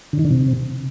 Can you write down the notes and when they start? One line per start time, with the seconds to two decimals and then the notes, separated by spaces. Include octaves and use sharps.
0.13 D3
0.19 D#3
0.25 D3
0.31 C3